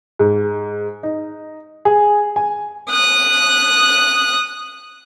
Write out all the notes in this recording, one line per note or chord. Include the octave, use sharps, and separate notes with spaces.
G#2
D#4
G#4
G#5
D#6 F#6